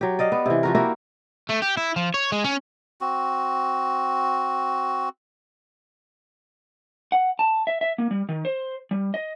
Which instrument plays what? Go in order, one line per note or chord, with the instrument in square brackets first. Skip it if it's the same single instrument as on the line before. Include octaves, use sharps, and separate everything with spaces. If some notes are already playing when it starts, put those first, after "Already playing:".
[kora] F#3 G4
D5 D#5 F5
B3
C3 E3
F3 F#4 A#4
A#3 E4 F#4 G4
[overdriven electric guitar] A3
G4
E4
F3
C#5
G#3
C#4
[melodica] C4 F#4
[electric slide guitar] F#5
A5
E5
E5
A#3
G3
D#3
C5
G3
D#5